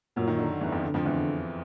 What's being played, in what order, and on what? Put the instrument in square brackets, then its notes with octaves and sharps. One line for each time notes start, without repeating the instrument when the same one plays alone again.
[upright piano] F#2 F#3 [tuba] A#2
[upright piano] D#3
D3
E2 E3
F2 F3
[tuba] D3
[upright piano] F2 F3
E2 E3